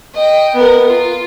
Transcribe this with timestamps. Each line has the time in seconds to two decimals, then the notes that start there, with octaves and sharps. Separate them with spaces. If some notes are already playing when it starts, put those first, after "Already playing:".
0.14 D#5 G5
0.55 B3 A#4
0.88 F4